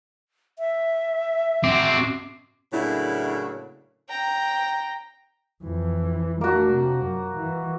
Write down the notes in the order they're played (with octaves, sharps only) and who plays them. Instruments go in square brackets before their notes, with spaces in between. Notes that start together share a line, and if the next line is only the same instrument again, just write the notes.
[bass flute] E5
[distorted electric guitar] C4 F#4 [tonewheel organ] C6 D6
[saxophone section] A2 C#3 F#3 A#3 D4 E4
[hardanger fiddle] G5 A#5
[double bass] F2 E3
[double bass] A3 D4 [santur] A#3 F#4
[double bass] C3
F#2
E3